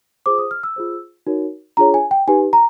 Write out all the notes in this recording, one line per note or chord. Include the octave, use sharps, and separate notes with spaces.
F4 G#4 C5 D6
D#6
F6
E6
F4 G#4 C5
D#4 F#4 A#4 C#5
D4 F4 G#4 C#5 A#5
G#5
G5
D#4 G4 B4 G#5
A#5